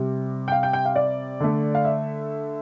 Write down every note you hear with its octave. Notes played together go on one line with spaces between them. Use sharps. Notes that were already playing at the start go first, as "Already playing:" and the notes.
Already playing: C3 G3
G5
F5
G5
G5
F5
D5
D3 A3
F5
E5